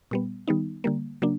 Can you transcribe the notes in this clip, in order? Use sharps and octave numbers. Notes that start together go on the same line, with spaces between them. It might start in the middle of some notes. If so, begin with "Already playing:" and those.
A#2 G3 B3
D#3 G3 B3 D#4
D3 G3 A#3
C#3 F#3 A#3 D4